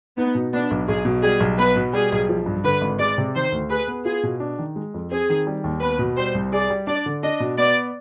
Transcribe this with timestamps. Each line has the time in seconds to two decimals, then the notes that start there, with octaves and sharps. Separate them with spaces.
0.18 B3 D#4
0.35 B2
0.53 B3 D4
0.71 B1
0.88 B1 G#4
1.05 B2
1.23 G3 G#4
1.40 B1
1.59 B3 B4
1.76 B2
1.93 G3 G#4
2.12 B1
2.29 F3
2.46 G2
2.64 D3 B4
2.81 G#1
2.99 G#3 D5
3.18 C3
3.35 D#3 C5
3.52 D2
3.70 G#4 B4
3.88 B3
4.05 F4 G#4
4.23 B2
4.40 D4
4.59 D#3
4.76 G#3
4.94 F2
5.11 C4 G#4
5.30 D#3
5.47 G3
5.64 D#2
5.81 B3 B4
5.99 B2
6.17 G3 C5
6.35 C2
6.52 G#4 D5
6.70 G3
6.87 D4 D5
7.06 D3
7.23 D4 D#5
7.40 B2
7.58 B3 D5